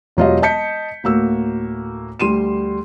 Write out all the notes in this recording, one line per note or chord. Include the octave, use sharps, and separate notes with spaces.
E1 F#3 F4 G4 D#5
D#5 A5 G6 B6 C#7
D2 A2 A#3 F#4 E6
D2 G3 C6 D#7 E7